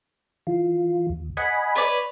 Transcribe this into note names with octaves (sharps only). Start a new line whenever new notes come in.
E3 F4
D#2
D#5 F#5 G#5 B5
B4 C#5 D5